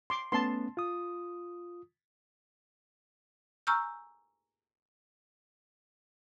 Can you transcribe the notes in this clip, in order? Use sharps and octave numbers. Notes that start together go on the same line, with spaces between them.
C6 D6
A3 B3 C#4 A5 C6
F4 D#6
G#5 A#5 C#6 E6 F6 G6